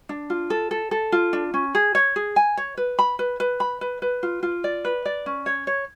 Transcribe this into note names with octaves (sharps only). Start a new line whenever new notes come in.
D4
F4
A4
A4
A4
F4
D4
C#4
G#4
C#5
G#4
G#5
C#5
B4
B5
B4
B4
B5
B4
B4
F4
F4
D5
B4
D5
C#4
C#5
C#5